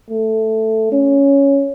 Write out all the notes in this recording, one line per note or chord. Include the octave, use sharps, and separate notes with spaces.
A3
C#4